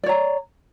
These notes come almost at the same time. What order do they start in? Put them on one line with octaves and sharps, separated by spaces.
D5 C#5 A#5